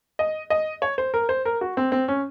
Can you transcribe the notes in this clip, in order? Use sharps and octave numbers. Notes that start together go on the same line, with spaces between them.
D#5
D#5
C#5
C5
A#4
C5
A#4
F#4
C4
C4
C#4